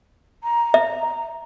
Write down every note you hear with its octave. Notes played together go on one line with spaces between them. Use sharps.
A#5
E5